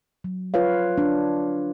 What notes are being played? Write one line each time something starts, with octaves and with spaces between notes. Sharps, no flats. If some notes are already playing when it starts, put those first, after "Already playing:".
F#3
F4 B4 C#5 F5
D4